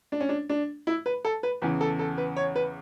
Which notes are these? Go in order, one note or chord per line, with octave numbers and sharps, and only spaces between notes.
D4
C#4
D4
D4
E4
B4
A4
B4
E2 C#3 E3 B4
A4
A4
B4
C#5
B4